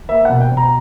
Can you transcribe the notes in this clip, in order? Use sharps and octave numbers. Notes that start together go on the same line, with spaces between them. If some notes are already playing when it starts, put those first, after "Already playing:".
A#3 E5
B2 F#5
G5
B2
A#5